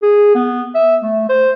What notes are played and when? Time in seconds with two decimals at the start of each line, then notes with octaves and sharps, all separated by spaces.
0.02 G#4
0.35 B3
0.75 E5
1.03 A3
1.29 C5